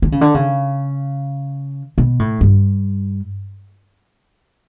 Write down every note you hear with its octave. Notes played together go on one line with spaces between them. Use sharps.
D3
C#3
D3
C#3
B2
A2
G2